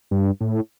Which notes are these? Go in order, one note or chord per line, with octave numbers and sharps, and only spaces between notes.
G2
A2